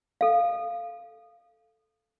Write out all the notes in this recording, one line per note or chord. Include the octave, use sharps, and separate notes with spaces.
A4 F5